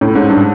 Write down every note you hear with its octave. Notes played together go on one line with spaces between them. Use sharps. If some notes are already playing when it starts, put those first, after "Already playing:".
A2
G#2
G2